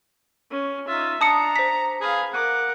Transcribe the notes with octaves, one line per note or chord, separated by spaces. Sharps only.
C#4
D#4 F4 E5
D4 A5 A#5 D#6 C#7
C5 B6
G#4 B4 F5
A#4 F#5 D6